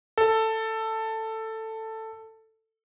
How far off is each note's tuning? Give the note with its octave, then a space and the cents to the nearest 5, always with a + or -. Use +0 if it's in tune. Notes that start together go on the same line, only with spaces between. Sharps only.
A4 +10